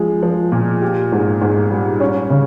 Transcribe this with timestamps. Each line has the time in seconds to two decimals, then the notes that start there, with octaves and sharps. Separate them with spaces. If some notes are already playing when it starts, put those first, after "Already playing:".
Already playing: F3 G#3
0.23 F3
0.52 A#2
0.82 G4
1.12 G#2
1.42 G#2
1.71 G3
2.00 C#4
2.30 C#3